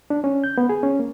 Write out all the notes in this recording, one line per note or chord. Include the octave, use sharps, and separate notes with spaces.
D4
C#4
G6
B3
G#4
C#4
A#3